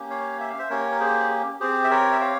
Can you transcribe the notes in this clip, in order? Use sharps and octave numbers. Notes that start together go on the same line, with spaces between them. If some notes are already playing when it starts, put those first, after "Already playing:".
Already playing: A#3 C#4 G4
C#5 F5
E5
F5
C5 E5
A#3 C#4 G4 A#4 C#5
A#4
G#4 C5
C4 G4 G#4 C5
E5
A#4 C#5
E5
C#5 F5